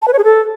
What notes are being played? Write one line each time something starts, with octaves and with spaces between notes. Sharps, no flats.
A5
B4
C#5
G#4
A4